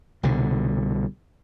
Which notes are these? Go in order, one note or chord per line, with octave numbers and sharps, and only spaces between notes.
C2 B2 D3